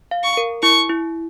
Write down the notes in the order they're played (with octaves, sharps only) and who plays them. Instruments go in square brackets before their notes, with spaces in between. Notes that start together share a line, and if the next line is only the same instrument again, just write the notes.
[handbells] F5
[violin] C#6
[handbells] A#4
[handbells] E4 [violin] C#6
[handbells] E4